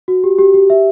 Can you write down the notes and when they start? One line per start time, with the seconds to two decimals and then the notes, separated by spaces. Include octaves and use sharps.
0.08 F#4
0.24 G4
0.39 G4
0.54 G4
0.70 E5